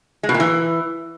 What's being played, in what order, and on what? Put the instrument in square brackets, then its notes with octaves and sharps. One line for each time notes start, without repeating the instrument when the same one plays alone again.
[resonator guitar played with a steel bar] G#3
B2
A#2
E3